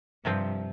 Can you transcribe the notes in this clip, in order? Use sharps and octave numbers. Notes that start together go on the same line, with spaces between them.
G2 C3 F3 C4